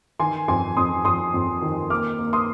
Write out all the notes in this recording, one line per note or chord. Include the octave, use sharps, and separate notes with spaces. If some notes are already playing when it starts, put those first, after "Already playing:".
D#3 G#5 C6
F2 G#5 C6
F2 C6 D#6
F2 C6 D#6
F2
D#3
A#3 D6 F6
A#3
C6 D#6